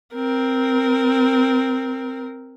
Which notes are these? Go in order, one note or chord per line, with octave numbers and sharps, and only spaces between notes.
C4 A#4